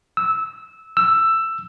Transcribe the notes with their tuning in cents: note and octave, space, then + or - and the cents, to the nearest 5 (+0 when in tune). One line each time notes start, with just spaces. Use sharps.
E6 -15
E6 +10